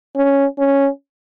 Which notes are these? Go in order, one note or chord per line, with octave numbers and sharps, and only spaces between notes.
C#4
C#4